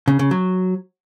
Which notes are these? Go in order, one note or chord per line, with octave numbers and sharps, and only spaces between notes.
C#3
C#3
F#3